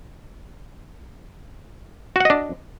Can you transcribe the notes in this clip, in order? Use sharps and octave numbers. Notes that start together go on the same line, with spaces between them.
D4 F#4 D#5 F#5